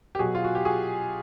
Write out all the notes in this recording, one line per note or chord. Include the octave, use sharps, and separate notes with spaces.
G4
B2 F#3 F#4 G#4
F4
F#4
G4
F#4 G#4